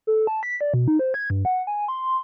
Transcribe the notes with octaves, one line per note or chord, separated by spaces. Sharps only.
A4
A5
B6
D5
B2
D#4
C5
G#6
G2
F#5
G#5
C6